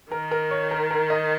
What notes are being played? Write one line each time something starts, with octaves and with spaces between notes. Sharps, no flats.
D#3 A#4
A#4
C#5
A#4
A#4
D#5